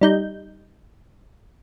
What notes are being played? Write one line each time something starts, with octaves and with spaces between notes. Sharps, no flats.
G3 D#4 G6